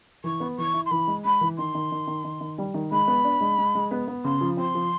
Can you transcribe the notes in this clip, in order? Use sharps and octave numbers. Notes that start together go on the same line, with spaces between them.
E3 C#6
B3
E3 C#6
E4
C6
E3 B5
G#3
G#3 B5
E3
D#3 C6
D#3
D#3
D#3
D#3
D#3
G3
D#3
G#3 B5
B3
D4
G#3
G#3
G#3
B3
B3
C#3 C6
F3
C4 C6
F3